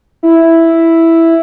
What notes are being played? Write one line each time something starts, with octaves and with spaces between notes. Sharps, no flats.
E4